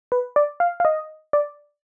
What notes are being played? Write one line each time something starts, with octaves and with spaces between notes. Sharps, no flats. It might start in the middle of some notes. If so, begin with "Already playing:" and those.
B4
D5
F5
F5
D#5
D5